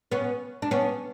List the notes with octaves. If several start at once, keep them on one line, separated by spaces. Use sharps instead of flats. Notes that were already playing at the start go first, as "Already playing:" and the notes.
B3 C#4
D4
B3 C#4